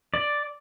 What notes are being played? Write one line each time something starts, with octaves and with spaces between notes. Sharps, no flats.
D5